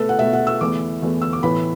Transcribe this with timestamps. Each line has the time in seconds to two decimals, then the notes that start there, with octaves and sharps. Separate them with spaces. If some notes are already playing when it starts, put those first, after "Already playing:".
Already playing: B2 A3 A4 B4
0.09 F#5
0.19 B2 A3 E5
0.33 F#5
0.47 E6
0.61 E2 E3 A3 D6
1.02 E2 E3 A3
1.22 E6
1.33 D6
1.43 A2 E3 B3 B5